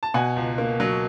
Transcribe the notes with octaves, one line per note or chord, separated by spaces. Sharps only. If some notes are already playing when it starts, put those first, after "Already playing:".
A5
B2 F#5 G#5
C#2
A#3
F#3